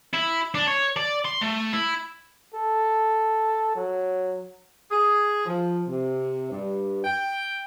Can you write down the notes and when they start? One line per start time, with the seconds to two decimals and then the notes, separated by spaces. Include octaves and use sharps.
0.13 E4
0.54 D4
0.67 C#5
0.96 D5
1.25 C6
1.41 A3
1.73 E4
2.54 A4
3.76 F#3
4.91 G#4
5.46 F3
5.87 C3
6.51 G2
7.04 G5